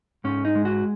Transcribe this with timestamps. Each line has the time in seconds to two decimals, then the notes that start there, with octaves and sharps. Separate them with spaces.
0.24 G#2 C#4
0.45 D#4
0.55 G#3
0.65 F#4